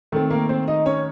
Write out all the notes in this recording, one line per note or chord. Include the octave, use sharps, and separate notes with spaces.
D#3 A3 C4 A4
A#3 A#4
C4 C5
D#4 D#5
C#4 C#5